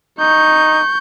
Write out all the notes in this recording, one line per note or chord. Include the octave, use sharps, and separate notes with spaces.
D#4 C#6 G6